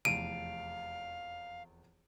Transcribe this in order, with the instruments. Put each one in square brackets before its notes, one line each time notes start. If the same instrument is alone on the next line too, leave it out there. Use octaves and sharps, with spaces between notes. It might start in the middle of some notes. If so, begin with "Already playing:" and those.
[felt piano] F1 E2 [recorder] F5 [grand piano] D7 [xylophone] D#7